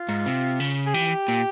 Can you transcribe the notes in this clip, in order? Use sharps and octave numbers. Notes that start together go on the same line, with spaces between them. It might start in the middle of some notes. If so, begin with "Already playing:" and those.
Already playing: F4
G#2
C3
C#3
G#4
E3 G4
A#2